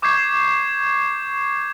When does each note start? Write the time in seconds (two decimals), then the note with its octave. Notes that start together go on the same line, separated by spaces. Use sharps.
0.02 C#6 D6 G6 G#6 C7